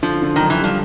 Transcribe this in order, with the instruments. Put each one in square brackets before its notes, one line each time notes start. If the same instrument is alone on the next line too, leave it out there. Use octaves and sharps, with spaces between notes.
[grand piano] D3 [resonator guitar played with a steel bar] F3
[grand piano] D3
[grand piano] F#2 [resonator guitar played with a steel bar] D#3
[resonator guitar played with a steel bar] E3
[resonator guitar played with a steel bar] F3 [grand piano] G3